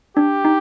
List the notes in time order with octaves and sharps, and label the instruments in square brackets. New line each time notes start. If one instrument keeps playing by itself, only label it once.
[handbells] D4 [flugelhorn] G4
[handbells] D#4